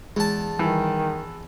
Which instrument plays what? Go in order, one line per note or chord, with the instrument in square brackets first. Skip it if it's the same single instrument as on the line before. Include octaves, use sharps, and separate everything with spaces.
[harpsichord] E2 A5 [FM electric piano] G#3
[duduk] D#3 [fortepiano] E3 [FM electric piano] G3